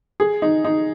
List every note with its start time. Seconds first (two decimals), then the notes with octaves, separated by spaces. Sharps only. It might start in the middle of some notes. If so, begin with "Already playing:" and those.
0.20 G#4
0.42 D#4
0.65 D#4